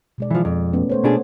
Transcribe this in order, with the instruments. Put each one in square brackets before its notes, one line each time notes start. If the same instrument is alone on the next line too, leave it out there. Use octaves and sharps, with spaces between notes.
[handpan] B2 G#3 D5
[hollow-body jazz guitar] E3 F3
F2
[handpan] A3 B3 C#4
A3 C5 C#5
[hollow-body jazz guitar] B2 D4 G#4 [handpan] A#3